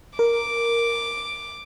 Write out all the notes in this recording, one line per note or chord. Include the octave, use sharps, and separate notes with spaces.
A#4 D6